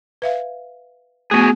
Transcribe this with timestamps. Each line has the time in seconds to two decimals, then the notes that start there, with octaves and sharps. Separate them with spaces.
0.22 B4 E5 F5
1.31 A3 B3 F#4 G#4